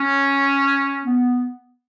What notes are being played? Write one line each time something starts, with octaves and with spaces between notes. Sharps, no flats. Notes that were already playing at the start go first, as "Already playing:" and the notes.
Already playing: C#4
B3